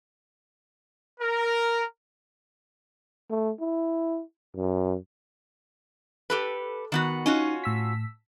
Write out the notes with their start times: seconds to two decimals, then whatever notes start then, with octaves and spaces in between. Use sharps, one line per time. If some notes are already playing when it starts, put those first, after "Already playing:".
1.20 A#4
3.30 A3
3.61 E4
4.56 F#2
6.30 G4 A4 B4
6.92 D#3 B3 F#4
7.26 C#4 D#4 F4 F#4
7.64 A2 E6 B6